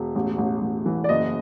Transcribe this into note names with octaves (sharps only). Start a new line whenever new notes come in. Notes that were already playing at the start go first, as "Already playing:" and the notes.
Already playing: E1
A1
A1
A1
E3
D5
F#1 D#5